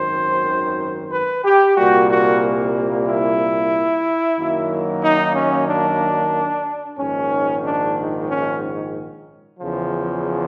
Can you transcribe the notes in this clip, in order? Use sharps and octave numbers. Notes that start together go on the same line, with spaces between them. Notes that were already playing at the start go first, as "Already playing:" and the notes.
Already playing: G#1 F#2 D#3 C5
B4
G4
C2 A#2 G3 A#3 F#4
F#4
E4
F#2 D#3 F#3 A#3
D#4
C#4
D4
A#1 G#2 D#3 C#4
D4
C#4
E2 C#3 F3